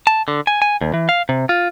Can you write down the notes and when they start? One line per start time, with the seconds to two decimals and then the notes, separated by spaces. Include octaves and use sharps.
0.07 A5
0.28 D3
0.47 G#5
0.62 G#5
0.81 D#2
0.94 E3
1.09 F5
1.29 C3
1.49 F4